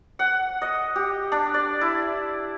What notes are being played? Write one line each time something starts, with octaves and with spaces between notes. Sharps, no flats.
F#5
D#5
G4
D4
D5
E4